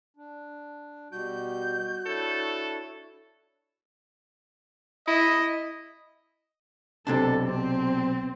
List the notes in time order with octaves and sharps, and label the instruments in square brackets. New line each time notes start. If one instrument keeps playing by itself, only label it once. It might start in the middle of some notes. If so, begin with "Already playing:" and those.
[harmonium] D4
[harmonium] B2 G3 [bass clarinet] F#4 [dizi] G6
[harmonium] D4 E4 C#5 [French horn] A4
[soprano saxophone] E4 [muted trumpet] D#5
[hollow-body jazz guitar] B1 C3 D4 [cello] A4
[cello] C4